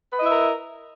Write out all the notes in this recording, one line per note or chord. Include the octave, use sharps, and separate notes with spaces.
E4 A#4 B4 D#5 E5